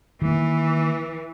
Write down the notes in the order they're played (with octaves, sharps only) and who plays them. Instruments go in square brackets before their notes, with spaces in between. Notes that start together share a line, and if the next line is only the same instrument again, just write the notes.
[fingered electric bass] D#3 A#3 [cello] E3